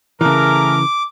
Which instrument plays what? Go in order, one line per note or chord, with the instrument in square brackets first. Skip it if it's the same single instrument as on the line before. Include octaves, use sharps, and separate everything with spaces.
[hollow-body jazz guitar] C#3 E3 [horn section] A3 G#4 A#4 [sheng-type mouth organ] D6